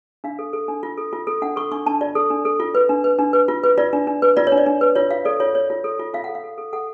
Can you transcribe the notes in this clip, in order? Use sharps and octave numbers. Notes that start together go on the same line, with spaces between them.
D4 F5
A4
A4
D4
F4
A4
F4
A4
D4 F#5
A4 C#6
D4 C#6
D4 A5
F4 D5
A4
D4
A4
F4
B4
D4
B4
D4
B4
F4
B4
F4 D5
D4
D4
B4
F4 D5
C#5
D4
D5
D4
B4
F4 C#5
F4 F5
A4 D5
F4 C#5
C#5
F4
A4
F4
F4 F5
A4 F#5
F5
A4
A4
A4 F#5